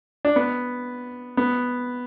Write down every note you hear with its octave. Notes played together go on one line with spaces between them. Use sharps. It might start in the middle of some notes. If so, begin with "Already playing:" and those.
D4
B3
B3